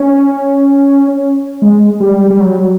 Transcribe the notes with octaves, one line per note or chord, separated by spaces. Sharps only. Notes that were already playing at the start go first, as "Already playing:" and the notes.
Already playing: C#4
G#3
G3
G3
F#3